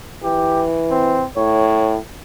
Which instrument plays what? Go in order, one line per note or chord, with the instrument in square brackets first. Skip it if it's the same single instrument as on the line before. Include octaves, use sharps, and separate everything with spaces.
[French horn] E3 [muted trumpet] G4
[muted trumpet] C4
[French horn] A2 [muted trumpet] C#5